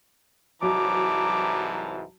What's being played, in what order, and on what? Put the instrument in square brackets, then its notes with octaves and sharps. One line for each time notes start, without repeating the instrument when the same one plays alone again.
[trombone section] C2 G#2 E3 [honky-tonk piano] F#3 [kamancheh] A5 A#5 [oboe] D6